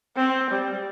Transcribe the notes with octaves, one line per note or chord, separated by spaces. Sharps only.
C4
G3